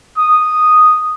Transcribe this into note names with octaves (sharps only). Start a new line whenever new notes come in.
D#6